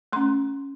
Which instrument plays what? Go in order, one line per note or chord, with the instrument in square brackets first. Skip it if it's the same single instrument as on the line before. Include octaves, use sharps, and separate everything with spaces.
[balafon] A3 C#4 C6